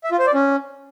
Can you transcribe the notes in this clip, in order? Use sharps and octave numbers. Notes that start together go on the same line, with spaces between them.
E5
F4
C5
D5
C#4